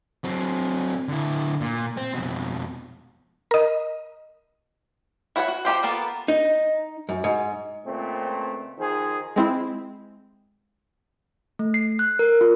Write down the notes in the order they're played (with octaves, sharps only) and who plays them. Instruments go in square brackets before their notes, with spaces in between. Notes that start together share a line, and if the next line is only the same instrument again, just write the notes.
[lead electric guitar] F#3 C4
D3 E4
A#2
C4
F2 B2
[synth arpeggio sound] A#4 D#5
[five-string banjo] E4 F#4 C5 C#5 F#5
F#4
F3 D#4 G4 C5
A#3 B3 F4 A4
[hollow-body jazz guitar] D#4
F#2
G#2
[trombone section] C#2 A#2 A3 C4
D#3 F3 D#4 G#4 C5
[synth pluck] G#3 C4 E4
[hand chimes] A3
C7
F#6
A#4
F4